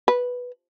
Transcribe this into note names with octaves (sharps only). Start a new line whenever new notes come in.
B4